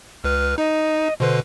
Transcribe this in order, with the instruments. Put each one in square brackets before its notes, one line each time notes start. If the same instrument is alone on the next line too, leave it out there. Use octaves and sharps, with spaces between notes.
[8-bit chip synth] C#2 B4 [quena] F6
[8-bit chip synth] D#4 [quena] D#5
[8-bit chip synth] B2 D3 B4 [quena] C5